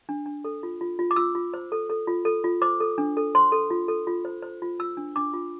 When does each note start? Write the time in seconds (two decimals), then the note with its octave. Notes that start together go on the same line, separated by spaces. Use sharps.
0.09 D4
0.26 D4
0.44 A4
0.63 F4
0.81 F4
0.99 F4
1.11 D6
1.16 F4 E6
1.35 F4
1.54 C5
1.72 A4
1.90 A4
2.07 F4
2.25 A4
2.44 F4
2.62 C5 D6
2.80 A4
2.98 D4
3.17 A4
3.35 C5 C6
3.52 A4
3.70 F4
3.88 A4
4.07 F4
4.25 C5
4.42 C5
4.62 F4
4.79 F4 E6
4.97 D4
5.16 D4 D6
5.33 F4